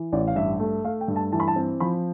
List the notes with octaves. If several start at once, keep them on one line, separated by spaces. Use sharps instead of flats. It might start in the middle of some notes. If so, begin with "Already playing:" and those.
Already playing: E3
A1 D5
F5
G2 E5
A3
A3 F5
G5
G2
A5
E3 A5
B5
A5
C4
F3 B5